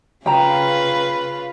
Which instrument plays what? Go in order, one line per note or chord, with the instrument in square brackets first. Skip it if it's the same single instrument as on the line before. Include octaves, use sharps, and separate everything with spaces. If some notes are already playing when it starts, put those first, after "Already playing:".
[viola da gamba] C#3 F4 B4 [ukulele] G5 A#5